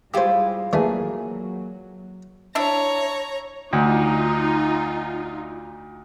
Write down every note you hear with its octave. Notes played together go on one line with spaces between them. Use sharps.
G3 G#3 E4 F4 G4 C5 G#5
E3 F#3 A3 A#3 D4 G#4
D4 E4 C#5 E5 A#5
D2 D#4 F4